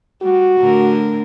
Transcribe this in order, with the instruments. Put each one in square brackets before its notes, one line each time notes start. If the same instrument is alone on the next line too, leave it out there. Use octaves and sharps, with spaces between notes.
[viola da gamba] G3 [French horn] F#4
[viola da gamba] A2 D3 A#4